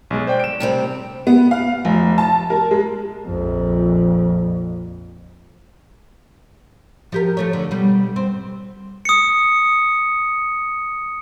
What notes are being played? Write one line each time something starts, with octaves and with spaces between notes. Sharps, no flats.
B1 G#3
C5 D5 G5
D7 E7
C3 G3 C4
B3
F5
F1
A5
A#4
G#3
A#1 F2
F3 G4 A#4
F3 A3 C#5
D3
B2 G3
C4
D#6 C#7